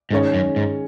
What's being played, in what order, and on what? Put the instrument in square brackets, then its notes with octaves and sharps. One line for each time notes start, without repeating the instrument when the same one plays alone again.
[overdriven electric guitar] G#2 [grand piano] D#3 G#3 C#4 G#4 C#5
[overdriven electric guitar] F#2
G#2